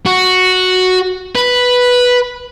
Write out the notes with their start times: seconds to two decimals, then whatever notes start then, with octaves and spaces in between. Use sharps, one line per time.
0.06 F#4
1.35 B4